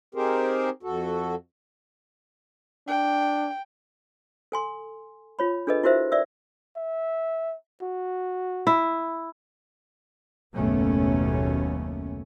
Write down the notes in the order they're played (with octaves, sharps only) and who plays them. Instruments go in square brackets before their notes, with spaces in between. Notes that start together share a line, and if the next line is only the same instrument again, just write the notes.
[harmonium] C4 D#4 G4 G#4 A#4 C5
F2 F#4 A4
[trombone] D4 [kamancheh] G5
[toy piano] A4 G#5 C6
F4 C#5 B5
D4 G#4 A4 B4 D#5
E4 F#4 A#4 C5 E5
D5 E5 E6
[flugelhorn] E5
F#4
[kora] E4
[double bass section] F#1 D#2 B2 A3 B3 C#4